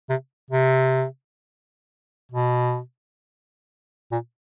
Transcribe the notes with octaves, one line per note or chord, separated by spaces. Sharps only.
C3
C3
B2
A#2